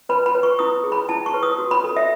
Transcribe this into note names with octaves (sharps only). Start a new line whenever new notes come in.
B4 B5
B5
B4
C#6
E4 D#6
G#4
B5
E4 A5
C#6
B4
D#6
F#4
B5
A4
E5